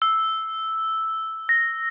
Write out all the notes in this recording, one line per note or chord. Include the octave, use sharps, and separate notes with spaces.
E6
A#6